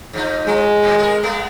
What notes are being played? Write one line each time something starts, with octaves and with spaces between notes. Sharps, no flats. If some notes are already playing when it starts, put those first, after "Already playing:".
G#2 F3 D#4
F3 G#3
D#2 A2 C4
F#4 G#4 A#4
G#3 A3 B3